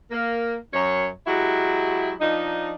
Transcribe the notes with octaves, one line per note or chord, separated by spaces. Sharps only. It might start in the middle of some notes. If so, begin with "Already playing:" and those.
A#3
F#2 C#5
F#3 G#3 E4 F#4 G4
F3 D4 D#4